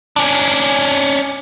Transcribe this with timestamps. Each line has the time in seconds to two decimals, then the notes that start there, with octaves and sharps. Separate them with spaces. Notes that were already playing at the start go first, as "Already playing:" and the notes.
0.16 C#4 D4